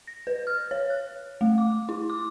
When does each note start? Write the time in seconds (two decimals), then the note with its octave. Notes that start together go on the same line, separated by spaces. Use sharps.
0.07 A#6
0.27 B4
0.47 F6
0.71 C#5
0.90 F#6
1.41 A3
1.58 D6
1.89 E4
2.10 D6